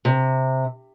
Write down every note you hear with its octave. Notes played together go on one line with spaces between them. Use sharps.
C3